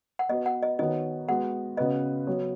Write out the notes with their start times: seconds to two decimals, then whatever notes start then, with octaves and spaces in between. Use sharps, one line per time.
0.19 F#5
0.29 B3 F#4 B4 D#5
0.46 F#5
0.63 D#5
0.79 D#3 B3 F#4 C#5 D#5
1.28 G#3 B3 F#4 F#5
1.77 C#3 B3 F#4 B4 D#5
2.27 F#3 B3 F#4 C#5